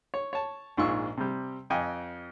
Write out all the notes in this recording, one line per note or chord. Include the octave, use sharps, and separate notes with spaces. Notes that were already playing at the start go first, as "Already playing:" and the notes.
C#5
C#5 A5
A#1 G#2 F4 C#6 E6
C3 G3
F2 D#5 G5 G#5